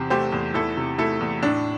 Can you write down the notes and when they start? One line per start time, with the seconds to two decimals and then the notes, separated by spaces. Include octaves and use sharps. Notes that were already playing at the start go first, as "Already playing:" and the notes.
Already playing: E2 C3 G4 C5
0.10 A3 G4 C5
0.32 E2
0.54 E2 E4 A4
0.77 C3
0.98 A3 E4 A4
1.21 E2
1.43 A2 D4